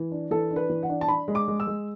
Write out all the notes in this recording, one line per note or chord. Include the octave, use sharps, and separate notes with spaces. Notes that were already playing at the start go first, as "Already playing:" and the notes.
Already playing: E3
D4
E3 A4
D4
B4
E3
F#5
D4
A5
D4 B5
G#3
D6
G#3
E6
G#3